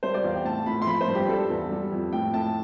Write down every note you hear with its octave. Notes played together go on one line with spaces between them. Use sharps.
G3 C5
D5
E2 F5
G5
A2 A5
A2 B5
C6
F3 B5
C5
G2
G4
G3 A4
E2
G3
F2
A2 G5
A2 A5